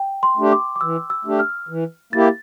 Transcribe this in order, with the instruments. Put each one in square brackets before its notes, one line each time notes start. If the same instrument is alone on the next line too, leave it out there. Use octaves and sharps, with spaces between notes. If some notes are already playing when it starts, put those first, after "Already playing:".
Already playing: [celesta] G5
C6
[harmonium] A3 D4 G4
[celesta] D6
D6
[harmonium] E3 [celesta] E6
[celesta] E6
[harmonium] A3 D4 G4
[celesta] F6
[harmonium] E3
[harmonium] A#3 E4 G4 [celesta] A6